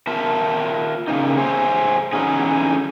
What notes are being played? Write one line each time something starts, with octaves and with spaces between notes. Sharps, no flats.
F4 A#4 E5 A5
C#3 A#3 D#4
G#4 C5 C#5 E5
D3 E3 F#3 C#4 D#4 G#4